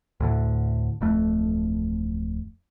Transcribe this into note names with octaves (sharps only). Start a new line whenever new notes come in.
D2 A2 D3
D1 F2 A3